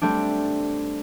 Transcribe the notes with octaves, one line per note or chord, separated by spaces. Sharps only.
G3 A3 C4 D4